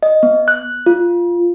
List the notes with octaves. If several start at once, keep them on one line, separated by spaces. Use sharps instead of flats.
D#5
B3
F#6
F4